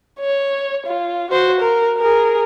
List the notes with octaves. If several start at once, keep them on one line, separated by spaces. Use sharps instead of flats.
C#5
F4
F#4 C5
A#4
G#4 A#4